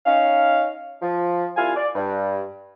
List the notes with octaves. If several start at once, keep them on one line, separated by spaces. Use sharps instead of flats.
C#4 D#4 F5
F3
C2 E4 F4 F5 G#5
D5
G2